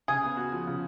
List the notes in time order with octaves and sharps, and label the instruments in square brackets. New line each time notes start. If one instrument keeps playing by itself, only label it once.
[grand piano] C#3 [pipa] G#4
[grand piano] B3
F#4
F3
C#3